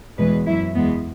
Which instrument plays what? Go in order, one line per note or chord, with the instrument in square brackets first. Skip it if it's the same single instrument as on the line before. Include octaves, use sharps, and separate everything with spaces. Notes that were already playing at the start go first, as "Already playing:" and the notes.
[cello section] E2 B2 G#3 B4
F#2 F#3 E4
E2 E3 G#3 B3